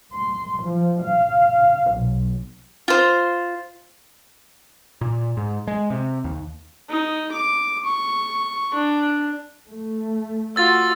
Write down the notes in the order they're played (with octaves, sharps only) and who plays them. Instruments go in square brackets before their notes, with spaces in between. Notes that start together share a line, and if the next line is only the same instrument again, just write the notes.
[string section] C6
F3
F5
B1
[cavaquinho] F4 C5
[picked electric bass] A#2
G#2
G#3
C3
D#2
[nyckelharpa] D#4
D6
C#6
D4
[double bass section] A3
[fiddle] F4 F#4 [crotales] E6 A6